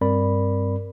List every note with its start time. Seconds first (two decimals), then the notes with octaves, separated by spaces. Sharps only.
0.01 G2 G3 C4 A#4 D5 B5